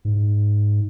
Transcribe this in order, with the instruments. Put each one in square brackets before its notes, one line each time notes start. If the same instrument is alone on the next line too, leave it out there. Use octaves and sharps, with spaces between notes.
[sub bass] G#2